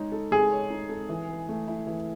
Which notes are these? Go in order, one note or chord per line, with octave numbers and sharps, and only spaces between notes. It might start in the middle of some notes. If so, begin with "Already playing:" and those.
Already playing: G#3 D#4 C#5
A4
G#3 G#4
C#5
D#4
A4
E3
B4
A3
E4
E3